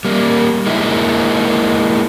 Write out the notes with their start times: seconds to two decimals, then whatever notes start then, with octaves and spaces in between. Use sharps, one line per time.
0.05 G3 A#3
0.67 G#3 A#3 D#4 E4